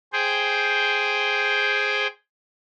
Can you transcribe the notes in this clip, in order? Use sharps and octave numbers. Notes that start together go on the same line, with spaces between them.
G#4 C5 G5